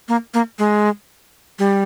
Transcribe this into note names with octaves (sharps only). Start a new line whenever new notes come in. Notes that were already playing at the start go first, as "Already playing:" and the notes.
A#3
A#3
G#3
G3